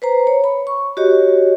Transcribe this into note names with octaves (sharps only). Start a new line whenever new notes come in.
B4 C5 A#5
C#5
B5
C#6
F#4 G4 C#5 D#5